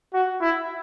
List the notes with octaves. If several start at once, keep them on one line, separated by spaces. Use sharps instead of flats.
F#4
E4